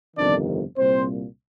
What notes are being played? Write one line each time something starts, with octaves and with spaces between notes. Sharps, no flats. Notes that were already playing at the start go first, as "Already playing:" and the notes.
G1 F2 C3 D#3 D4 D5
C2 A#2 C4 C5